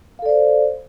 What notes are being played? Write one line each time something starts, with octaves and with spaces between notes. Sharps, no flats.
A4 C5 D5 F5